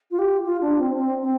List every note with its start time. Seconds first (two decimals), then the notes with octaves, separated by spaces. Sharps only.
0.11 F4
0.19 G4
0.45 F4
0.61 D4
0.79 C4
0.97 C4
1.22 C4